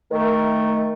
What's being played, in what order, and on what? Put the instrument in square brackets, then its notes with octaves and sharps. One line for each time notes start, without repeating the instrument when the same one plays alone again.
[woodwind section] D#3 A3 [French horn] A#4